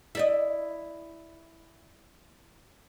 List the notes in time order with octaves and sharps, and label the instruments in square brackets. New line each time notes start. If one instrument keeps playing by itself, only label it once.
[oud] E4 D5 D#5